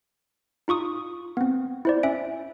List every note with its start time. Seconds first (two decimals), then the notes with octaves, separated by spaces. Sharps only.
0.68 D#4 F4 C#6 D#6
1.37 B3 C4
1.85 E4 C5 D5
2.03 C#4 E5 D7